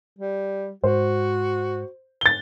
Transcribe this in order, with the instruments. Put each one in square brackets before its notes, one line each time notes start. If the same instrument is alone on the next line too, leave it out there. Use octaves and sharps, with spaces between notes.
[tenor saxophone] G3
[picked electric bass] G#2 [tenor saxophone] F#4 [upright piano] C5
[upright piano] A6 G7